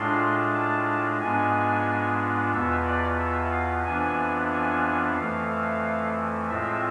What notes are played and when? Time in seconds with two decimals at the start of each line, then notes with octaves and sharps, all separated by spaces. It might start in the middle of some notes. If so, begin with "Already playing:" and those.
Already playing: A2 G#3 D4 F4 C6
0.54 A5
1.20 G#2 G#3 B3 D4 F4 G#5
2.53 E2 B2 B3 F4 E5
2.86 D5
3.19 E5
3.52 F5
3.85 F2 E3 B3 D4 F4 G#5
4.52 G#5
5.17 F2 E3 A3 F5
6.49 A2 G#3 C4 F4 E5